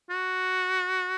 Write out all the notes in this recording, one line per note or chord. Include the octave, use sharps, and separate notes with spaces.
F#4